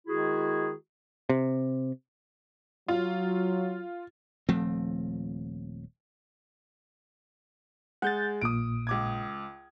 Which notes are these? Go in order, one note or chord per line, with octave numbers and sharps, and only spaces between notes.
D#3 G#3 E4 F#4 G#4
C3
F#3 F4
D#1 F3 A3 C4
G#3 F#5 G6 A6
A#1 A#2 D#6 D7
C#2 D6 G#6